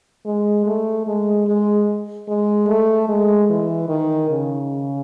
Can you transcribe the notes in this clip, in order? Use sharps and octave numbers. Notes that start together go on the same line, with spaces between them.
G#3
A3
G#3
G#3
G#3
A3
G#3
E3
D#3
C#3